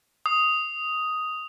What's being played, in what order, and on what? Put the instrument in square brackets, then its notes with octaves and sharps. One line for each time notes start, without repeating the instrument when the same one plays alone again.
[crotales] D#6